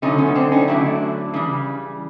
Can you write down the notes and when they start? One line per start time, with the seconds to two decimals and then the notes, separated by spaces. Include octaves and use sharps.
0.02 D3 F#3 A3 C#4 D#4
0.18 B3 C#4
0.35 C4 D4
0.51 C#4 D#4
0.68 D3 F#3 A3 D4 E4
1.34 C#3 E3 G3